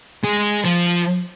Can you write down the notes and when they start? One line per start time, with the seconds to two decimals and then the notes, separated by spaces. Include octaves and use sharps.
0.24 G#3
0.65 F3